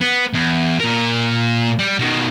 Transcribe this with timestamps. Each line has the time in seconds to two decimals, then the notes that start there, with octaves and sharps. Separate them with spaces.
0.01 B3
0.33 E2
0.80 A#2 A#4
1.79 G3
1.99 B2 D#3